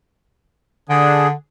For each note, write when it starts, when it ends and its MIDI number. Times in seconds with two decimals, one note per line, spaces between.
0.89 1.32 50
0.89 1.27 62
0.89 1.27 68